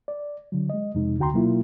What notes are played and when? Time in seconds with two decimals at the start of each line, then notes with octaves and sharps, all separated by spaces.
0.08 D5
0.52 D3 F#3
0.70 G#3 D#5
0.95 F2 C3 G#3 D#4
1.19 D2 D3 F#4 G5 A#5 C6
1.33 B2 F#3 A#3 E4 F4